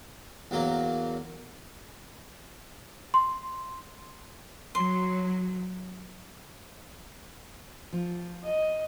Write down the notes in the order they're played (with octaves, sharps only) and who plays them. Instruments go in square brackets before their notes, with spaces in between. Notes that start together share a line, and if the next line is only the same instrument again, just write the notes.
[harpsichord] E2 F#3 A#3
[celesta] C6
[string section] F#3 [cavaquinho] C6
[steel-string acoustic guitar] F3 F4
[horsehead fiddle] D#5